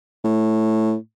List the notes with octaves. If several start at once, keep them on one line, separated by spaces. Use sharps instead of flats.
A2